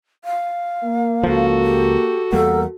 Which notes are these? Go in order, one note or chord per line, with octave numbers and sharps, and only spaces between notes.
F5
A#3
C#2 F3 F#4 A4
G4
E2 G3 A#3 A4 A#4 F#5